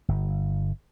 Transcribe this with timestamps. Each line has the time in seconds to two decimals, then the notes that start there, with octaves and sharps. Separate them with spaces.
0.08 G1